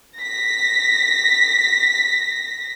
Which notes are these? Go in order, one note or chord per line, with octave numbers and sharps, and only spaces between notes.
A#6 B6